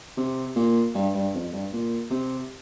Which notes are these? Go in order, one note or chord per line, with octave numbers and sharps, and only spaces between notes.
C3
A#2
G2
G2
F2
G2
A#2
C3